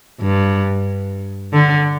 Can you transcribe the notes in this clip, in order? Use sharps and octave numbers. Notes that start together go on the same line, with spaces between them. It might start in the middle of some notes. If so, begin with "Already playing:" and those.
G2
D3